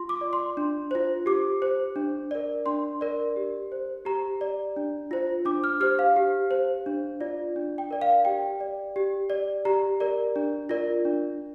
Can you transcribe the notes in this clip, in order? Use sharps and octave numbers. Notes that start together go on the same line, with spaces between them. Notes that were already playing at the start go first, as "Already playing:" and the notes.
Already playing: F4 C6
D6
D5
C6
D4
F4 C5
G4 D6
C5
D4
A#4 D5
D4 C6
A#4 D5
G4
C5
G4 A#5
D5
D4
F4 C5
D4 D6
F6
G4 C5 F6
F5
G4
C5
D4
F4 D5
D4
G5
A#4 D5
F5
G4 G5
D5
G4
D5
G4 A#5
A#4 D5
D4
F4 A#4 D5
D4